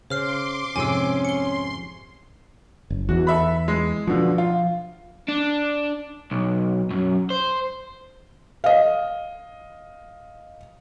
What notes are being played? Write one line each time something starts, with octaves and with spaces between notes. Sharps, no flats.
C#3 C5 C6 D6 F6 C7
F2 G#2 C3 C#4 G#5 E6
C6 C#7 G7
F#1
E2 E3 F#4
A4 E5 B5
G#3
B2 D3 F3
F4
D4
B1
F#2
C5
D#5 F5